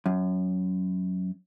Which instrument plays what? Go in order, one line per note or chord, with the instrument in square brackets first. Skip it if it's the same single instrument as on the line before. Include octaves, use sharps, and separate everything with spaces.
[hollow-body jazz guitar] F#2